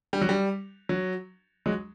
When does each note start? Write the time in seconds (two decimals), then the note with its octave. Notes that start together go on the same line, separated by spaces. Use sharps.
0.13 G3
0.21 F#3
0.29 G3
0.89 F#3
1.66 F#3 G#3